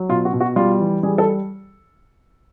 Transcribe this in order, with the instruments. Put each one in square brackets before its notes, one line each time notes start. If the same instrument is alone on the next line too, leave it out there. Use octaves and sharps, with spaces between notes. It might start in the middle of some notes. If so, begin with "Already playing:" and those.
Already playing: [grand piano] F#3
B2 F4
F#4
B2
F#4
G3 F4
E3
G3 G#4
A4